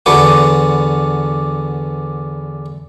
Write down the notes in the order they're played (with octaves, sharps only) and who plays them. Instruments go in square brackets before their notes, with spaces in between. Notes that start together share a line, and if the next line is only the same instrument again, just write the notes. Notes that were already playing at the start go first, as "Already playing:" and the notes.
[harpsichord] E2 D3 D4 F#4 B4 D6